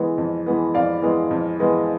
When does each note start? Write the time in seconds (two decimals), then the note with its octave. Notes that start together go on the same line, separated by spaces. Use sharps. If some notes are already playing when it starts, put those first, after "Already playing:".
Already playing: E3 G#3 B3
0.18 F2
0.46 E3 G#3 B3
0.74 F2 D5 F5
1.02 E3 G#3 B3
1.31 F2
1.60 E3 G#3 B3